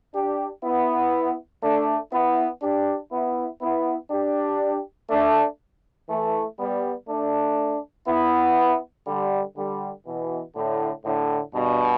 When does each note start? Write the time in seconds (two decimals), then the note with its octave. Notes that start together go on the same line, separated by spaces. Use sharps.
0.14 D4 G4
0.64 B3 E4
1.63 A3 D4
2.13 B3 E4
2.62 D4 G4
3.12 B3 E4
3.61 B3 E4
4.11 D4 G4
5.10 A3 D4
6.09 E3 A3
6.59 G3 B3
7.09 A3 D4
8.08 B3 E4
9.07 D3 G3
9.57 D3 G3
10.07 B2 E3
10.56 A2 D3
11.05 A2 D3
11.55 G2 B2